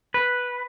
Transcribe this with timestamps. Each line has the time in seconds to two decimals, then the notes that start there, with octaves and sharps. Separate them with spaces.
0.14 B4